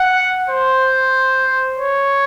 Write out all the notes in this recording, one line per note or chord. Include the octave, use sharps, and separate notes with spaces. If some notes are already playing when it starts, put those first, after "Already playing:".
Already playing: F#5
C5
C#5